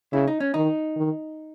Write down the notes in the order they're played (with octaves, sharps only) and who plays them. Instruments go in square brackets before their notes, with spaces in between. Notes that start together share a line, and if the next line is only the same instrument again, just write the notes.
[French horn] C#3 [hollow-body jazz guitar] E4
[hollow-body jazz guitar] D#4
C#4
[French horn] D#3 [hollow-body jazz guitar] D#4
[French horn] D#3